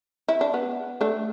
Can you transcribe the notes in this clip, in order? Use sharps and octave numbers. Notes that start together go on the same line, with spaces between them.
E4
D4
B3
A3 D4